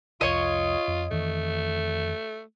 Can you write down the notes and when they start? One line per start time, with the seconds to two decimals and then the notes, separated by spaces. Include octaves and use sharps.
0.21 C2 F2 F4 C#5 D#5
0.88 F2
1.11 F2 D#3 E3 A3